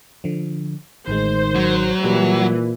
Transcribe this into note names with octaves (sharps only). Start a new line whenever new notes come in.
D3 F3
A1 A2 D#3 G#3 C5
F#3
A#2 E3 G3